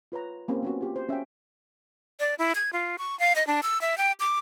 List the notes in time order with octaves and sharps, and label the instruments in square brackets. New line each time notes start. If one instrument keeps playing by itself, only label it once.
[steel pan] F4 B4 C#5 A#5
A#3 C4 C#4 G4
B3 C#4 F#4
F4 G4
C5
C#4 E5 F5 G5
[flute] D5
E4
G#6
F4
C#6
F5
D#5
D4
E6
E5
G5
D6